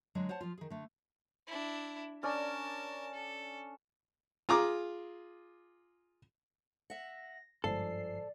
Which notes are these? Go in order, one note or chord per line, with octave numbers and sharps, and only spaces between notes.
D3 F#3 G#3
C5 C#5 F#5 A5
F3 F4
D#3 G#4
D3 A3
D4 E4
C#4 D4 A#4 D5 A5
A4
F4 G#4 A#5 D6
E5 F#5 A#6
G1 G#2 F3 A4 D5 C7